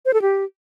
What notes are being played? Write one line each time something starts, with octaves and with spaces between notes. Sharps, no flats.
C5
A4
G4